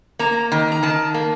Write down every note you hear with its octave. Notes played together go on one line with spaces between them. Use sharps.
A#3 A#5
D#3
A#5
D#3 A5
A#3